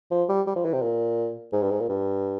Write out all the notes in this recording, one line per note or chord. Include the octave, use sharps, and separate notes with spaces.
F3
G3
G3
F3
E3
C3
A#2
G#2
G2
G#2
A#2
G2